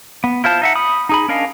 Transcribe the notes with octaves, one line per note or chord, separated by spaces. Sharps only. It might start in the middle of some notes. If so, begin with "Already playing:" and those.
B3
E4 F4 C5 A5
D#4 E5 F#5
B5 D#6
D#4 G#4 B5
C#4 D4 A#4 D#5 F5